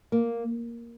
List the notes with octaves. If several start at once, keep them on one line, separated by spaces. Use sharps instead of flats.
A#3